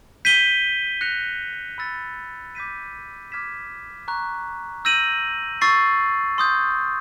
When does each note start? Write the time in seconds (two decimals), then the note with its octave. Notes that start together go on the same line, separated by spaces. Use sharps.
0.25 G6 B6 D#7 G7
1.01 F#6 A#6 C#7 F7
1.78 B5 E6 A6 C#7
2.55 D6 G6 B6 D#7
3.32 D6 F6 G#6 B6 E7
4.08 A#5 C#6 F#6
4.85 E6 G6 A#6 D#7 F#7
5.61 C#6 E6 A6 C7
6.38 C6 D#6 G6